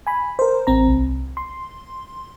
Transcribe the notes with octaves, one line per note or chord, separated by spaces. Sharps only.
G#5 B5
A#4 C5
A1 C4 A#5
C2
C6